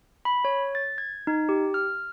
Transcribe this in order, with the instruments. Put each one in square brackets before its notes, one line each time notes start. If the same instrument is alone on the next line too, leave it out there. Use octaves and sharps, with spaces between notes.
[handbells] B5
C#5
A6
G#6
D#4
G4
F6